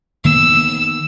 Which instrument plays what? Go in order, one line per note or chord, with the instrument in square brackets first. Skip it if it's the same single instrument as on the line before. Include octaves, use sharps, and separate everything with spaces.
[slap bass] D#3 A#3 B3 [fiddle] E6